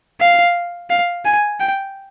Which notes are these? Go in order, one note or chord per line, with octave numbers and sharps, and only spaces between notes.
F5
F5
G#5
G5